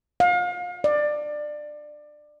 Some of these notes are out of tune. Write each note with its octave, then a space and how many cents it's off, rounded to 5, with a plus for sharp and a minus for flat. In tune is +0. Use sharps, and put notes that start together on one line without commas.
F5 +35
D5 +20